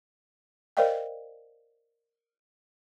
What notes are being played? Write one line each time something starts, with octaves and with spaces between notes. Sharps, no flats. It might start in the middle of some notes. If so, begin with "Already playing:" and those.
A#4 C5 D5 D#5 F5 G5